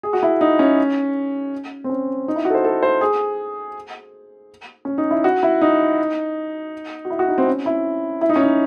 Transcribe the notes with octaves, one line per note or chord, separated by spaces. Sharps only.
G#4
F#4
E4
D#4
C#4
C4
C#4
D#4
E4
F#4
A4
C5
A4
C5
G#4
C#4
D#4
E4
F#4
E4
D#4
F#4
E4
F#4
D#4
C4
C#4
E4
E4
D#4
C#4
D#4